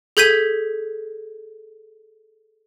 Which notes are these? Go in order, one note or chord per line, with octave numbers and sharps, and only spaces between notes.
G#4 A4 G6 G#6 B6 D#7